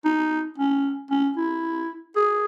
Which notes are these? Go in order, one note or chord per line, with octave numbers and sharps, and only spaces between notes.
D#4
C#4
C#4
E4
G#4